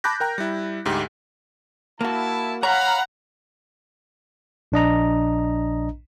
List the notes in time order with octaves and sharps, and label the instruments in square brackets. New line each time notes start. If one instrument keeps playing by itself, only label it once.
[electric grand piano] A5 B5 D6 F#6 G6 A#6
A#4 G5 A#5
G3 E4
D2 G#2 G4
[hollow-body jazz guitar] A#3 F#4 [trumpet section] E4 A5
[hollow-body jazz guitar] C#5 [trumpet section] F5 B5 [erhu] F#5 [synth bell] A#5
[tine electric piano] A#1 D4 D#5 A#5